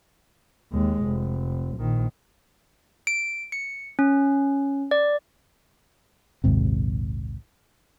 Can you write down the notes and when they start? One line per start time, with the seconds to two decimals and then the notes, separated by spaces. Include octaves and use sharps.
0.72 D#2 G#3
1.04 F1
1.77 A#1 D#3
3.07 D7
3.52 C#7
3.99 C#4
4.91 D5
6.44 A#1 D#2 G#2 C3